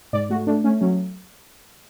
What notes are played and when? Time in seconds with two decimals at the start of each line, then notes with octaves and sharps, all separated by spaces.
0.13 G#2 D5
0.30 A3 F#4
0.47 A3 D4
0.64 A3 C#4
0.81 F#3 C#4